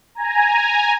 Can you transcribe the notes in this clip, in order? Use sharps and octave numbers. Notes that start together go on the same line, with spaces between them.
G#5 A#5